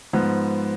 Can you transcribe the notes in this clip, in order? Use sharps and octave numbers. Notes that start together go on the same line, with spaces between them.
G#2 F3 B3